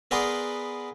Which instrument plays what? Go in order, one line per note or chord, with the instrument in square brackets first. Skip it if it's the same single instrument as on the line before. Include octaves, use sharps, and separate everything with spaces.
[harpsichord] B3 G#4 A#4 B4 D5 C6